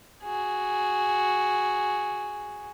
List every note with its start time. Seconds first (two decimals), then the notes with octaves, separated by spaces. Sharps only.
0.24 F#4 G#4